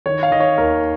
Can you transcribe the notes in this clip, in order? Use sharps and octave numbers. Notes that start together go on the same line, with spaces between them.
D#3 C#5
F5
D#3 D#5
C#5
D#2 A#4